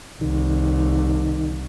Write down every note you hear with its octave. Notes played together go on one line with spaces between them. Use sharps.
C2 D#3